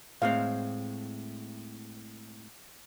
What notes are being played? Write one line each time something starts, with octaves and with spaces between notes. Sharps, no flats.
A2 G#3 C4 F5